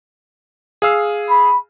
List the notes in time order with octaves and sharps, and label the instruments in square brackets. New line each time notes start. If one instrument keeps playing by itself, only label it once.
[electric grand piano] G#4 F5 E6
[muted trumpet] B5